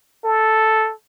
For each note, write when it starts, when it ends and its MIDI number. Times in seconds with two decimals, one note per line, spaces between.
0.25 0.92 69